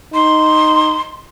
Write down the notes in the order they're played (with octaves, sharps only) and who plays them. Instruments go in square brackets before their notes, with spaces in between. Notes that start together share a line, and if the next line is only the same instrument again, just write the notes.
[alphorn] D#4 [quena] C6